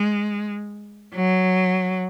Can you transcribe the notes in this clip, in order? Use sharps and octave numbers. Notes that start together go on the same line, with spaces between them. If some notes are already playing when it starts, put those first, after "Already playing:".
Already playing: G#3
F#3